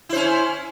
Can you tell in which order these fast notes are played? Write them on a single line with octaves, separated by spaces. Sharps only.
E4 C5 C#4